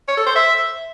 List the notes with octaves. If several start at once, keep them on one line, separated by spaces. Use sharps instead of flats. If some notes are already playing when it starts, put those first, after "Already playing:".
C#5
A4
C5
E5